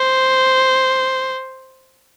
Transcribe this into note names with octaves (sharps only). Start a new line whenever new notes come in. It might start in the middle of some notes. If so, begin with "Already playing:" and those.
Already playing: C5